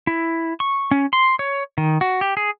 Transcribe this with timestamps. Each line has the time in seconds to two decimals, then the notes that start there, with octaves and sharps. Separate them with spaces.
0.07 E4
0.60 C#6
0.91 C#4
1.13 C6
1.39 C#5
1.78 D#3
2.01 F#4
2.21 G4
2.37 G#4